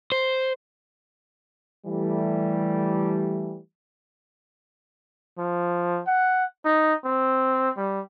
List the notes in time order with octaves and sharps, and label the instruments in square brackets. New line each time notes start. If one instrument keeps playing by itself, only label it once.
[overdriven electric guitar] C5
[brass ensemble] E3 G3 A3
[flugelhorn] F3
F#5
D#4
C4
G3